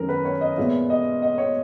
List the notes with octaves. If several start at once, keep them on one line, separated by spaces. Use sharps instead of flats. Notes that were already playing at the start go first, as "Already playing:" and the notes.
Already playing: F#2 D#3 G#3 C#4 G#4 A#4
B4
C#5
D#5
A#2 G#3 B3 E5
D#5
D#5
C#5